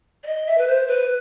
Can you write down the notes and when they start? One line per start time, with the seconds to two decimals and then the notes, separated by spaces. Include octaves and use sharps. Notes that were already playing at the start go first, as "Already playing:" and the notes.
0.23 D5
0.26 D#5
0.46 E5
0.58 B4
0.67 C5
0.87 B4